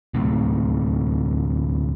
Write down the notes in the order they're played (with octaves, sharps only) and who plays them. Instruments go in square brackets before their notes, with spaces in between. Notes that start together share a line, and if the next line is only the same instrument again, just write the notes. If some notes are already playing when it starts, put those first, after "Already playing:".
[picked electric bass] D2 A2 C3